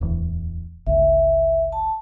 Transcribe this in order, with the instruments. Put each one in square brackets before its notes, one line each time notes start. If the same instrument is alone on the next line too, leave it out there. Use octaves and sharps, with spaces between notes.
[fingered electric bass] D1 E2
[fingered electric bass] G1 C#2 [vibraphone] E5
[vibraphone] A5